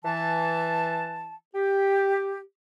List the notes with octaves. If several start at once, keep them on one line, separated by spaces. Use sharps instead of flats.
E3 A5
G4